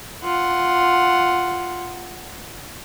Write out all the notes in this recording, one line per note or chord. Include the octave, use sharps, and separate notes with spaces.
F4 F#5